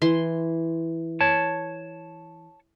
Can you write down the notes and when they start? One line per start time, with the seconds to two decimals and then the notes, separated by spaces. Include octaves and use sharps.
0.02 E3 C6
1.21 C#5 A5